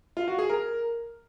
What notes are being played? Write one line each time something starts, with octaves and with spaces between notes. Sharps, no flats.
F4
F#4
G#4
A#4